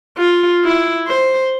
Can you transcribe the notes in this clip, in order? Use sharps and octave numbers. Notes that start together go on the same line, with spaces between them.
F4
E4
C5